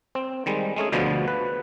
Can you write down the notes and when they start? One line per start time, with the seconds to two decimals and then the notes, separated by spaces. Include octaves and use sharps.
0.15 C4
0.46 D#3 G3 G#3
0.76 G#3 A3 C#4 G#4
0.92 D2 B2 D3 F3 B3
1.28 B4